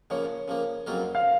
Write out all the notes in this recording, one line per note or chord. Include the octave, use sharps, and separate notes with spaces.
C#3 F3 A#3 C#5
C#3 F3 A#3
F2 C#3 F#3 A#3 F4
F5